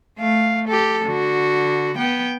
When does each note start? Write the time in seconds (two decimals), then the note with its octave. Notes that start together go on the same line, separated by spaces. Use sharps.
0.19 A3 F5
0.68 G4 A4
1.05 D3 F#4
1.97 B3 G5